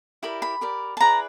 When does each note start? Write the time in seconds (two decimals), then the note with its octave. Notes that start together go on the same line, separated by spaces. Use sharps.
0.23 E4 G4 A#4 D5 B5
0.42 B5
0.61 G4 A#4 D5
0.97 A5
1.00 E4 G#4 B4 D5 A#5